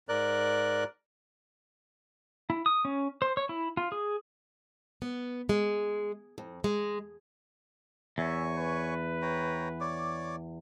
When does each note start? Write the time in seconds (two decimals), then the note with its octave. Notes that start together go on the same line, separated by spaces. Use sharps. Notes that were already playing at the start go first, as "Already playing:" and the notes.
0.09 G#2 A#4 D5 F#6
2.50 E4
2.66 D#6
2.85 C#4
3.22 C5
3.37 C#5
3.49 E4
3.77 F4
3.92 G#4
5.02 B3
5.49 G#3
6.38 F2
6.64 G#3
8.18 E2 C#5 E5 G#5 C#6
8.57 B4
9.22 C#5 G5 A#5
9.81 C#5 D5 D6